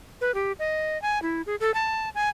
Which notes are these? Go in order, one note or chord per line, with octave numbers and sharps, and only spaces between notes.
B4
G4
D#5
G#5
E4
G#4
A4
A5
G#5